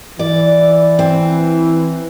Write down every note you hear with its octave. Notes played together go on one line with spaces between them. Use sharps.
E3 D5
C4